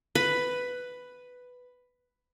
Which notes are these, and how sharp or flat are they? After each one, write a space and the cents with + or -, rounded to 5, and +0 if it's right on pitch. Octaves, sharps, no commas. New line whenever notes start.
B4 +5